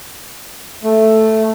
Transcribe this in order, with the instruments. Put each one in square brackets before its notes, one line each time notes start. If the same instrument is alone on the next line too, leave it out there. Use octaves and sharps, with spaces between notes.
[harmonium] A3